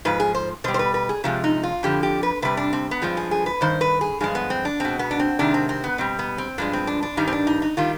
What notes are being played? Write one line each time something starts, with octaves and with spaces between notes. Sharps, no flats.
G#2 F3 B4
G#4
C5
B2 G3 C5
C5
B4
B4
G#4
C3 F3 G#3 G4
D#4
F4
F2 D3 F3 G4
G4
B4
C3 G3 B4
D4
C4
B3
G2 F3 G#3 C4
G#4
G#4
B4
G2 D#3 C5
B4
G#4
G2 F3 G#3 G#4
B3
C4
D4
B2 G#3 C4
B3
D4
C4
C3 D#3 G#3 D4
C4
C4
B3
B2 G3 C4
B3
C4
G2 F3 G#3 D4
C4
D4
D4
G2 D#3 G3 D#4
C4
D4
D#4
D#4
D#3 G3 F4